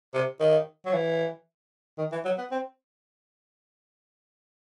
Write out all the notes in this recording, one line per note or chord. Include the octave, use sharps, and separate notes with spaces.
C3
D#3
F#3
E3
D#3
E3
F#3
B3
C4